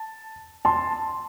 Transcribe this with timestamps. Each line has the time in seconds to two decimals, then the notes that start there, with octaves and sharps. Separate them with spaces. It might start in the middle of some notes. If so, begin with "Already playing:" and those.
Already playing: A5
0.65 A5 C6